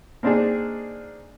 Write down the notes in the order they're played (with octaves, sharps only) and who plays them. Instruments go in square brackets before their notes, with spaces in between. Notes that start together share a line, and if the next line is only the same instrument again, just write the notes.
[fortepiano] A#3 C4 D4 D#4 G#4